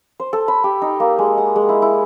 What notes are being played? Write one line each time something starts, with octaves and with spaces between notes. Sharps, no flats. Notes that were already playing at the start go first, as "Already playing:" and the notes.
C5
A4
B5
G4
D#4
A#3
G#3
F#5
G#3
E4
E4